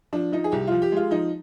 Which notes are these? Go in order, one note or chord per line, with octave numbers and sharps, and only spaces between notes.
F3 D4
F3 D#4
G#4
C2 G4
F3 F4
G4
G#3 F4
F3 D#4